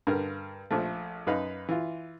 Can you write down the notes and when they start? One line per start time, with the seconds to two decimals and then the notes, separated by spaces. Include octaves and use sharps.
0.07 G2 D3 A#4
0.71 A#1 F3 A3
1.27 F#2 D#4 B4 F5
1.69 E3 F4